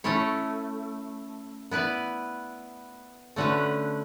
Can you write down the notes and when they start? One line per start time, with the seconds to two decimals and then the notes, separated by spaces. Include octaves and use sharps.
0.04 A3 C#4 E4 A4 C#5
1.71 B3 E4 B4 D5
3.36 D3 A3 C#4 F#4 B4